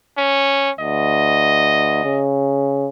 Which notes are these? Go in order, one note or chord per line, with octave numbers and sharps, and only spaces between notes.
C#4
D2 D#5
C#3